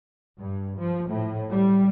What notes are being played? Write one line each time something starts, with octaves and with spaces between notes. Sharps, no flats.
G2
F3
A2
G3